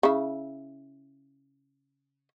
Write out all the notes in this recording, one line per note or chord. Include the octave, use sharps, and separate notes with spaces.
C#3 E4